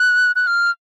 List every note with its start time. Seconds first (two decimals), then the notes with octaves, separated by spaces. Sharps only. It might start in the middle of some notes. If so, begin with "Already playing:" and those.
Already playing: F#6
0.36 F#6
0.47 F6